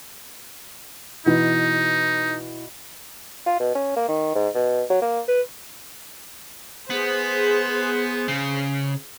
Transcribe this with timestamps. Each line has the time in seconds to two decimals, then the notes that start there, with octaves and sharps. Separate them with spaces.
1.26 B2 E3 D#4
3.46 F4
3.60 B2
3.75 C#4
3.96 A#3
4.08 D#3
4.35 G#2
4.54 B2
4.90 F#3
5.02 A#3
5.28 B4
6.90 B3 G#4 C5
8.28 C#3